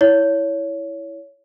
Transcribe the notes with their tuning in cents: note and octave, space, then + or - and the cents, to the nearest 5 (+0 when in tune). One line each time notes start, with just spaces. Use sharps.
E4 +0 C#5 +20